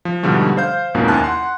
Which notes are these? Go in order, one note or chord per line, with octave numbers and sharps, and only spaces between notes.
F3
G#2 B2 D3 F3 G3 A3
C5 F5 G6
F2 G#2 B2 A#3 C#4 F4
D#2 E4 G#5 A5 F#6
F#5 C6